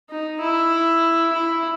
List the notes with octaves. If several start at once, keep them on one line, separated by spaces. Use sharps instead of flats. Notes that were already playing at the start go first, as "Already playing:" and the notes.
D#4
E4
E4